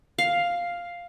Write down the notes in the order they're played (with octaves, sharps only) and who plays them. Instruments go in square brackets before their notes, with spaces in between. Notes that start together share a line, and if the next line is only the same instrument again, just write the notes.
[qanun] F5